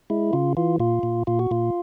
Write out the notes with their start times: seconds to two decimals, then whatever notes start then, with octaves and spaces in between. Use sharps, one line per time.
0.10 G#3 E4
0.33 C#3 F4
0.57 E3 F4
0.80 A#2 F4
1.03 A#2
1.27 A#2 F4
1.39 F#4
1.51 A#2 F4